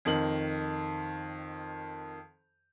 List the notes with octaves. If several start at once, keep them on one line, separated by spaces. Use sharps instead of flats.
F2 D#3 F#7